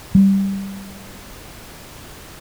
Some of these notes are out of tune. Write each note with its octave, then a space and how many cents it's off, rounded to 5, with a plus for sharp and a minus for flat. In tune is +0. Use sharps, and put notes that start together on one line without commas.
G3 -5